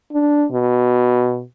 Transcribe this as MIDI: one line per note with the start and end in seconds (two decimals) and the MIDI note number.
0.12 0.45 62
0.51 1.42 47